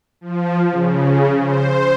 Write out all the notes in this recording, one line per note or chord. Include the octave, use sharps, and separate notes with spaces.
F3
C#3
C5